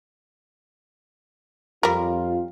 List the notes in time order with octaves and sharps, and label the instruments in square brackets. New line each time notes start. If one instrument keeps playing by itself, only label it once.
[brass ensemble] F2 F4 [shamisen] G3 A#4